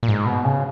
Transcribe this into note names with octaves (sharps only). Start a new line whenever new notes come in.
A#2
G#2
B2
C#3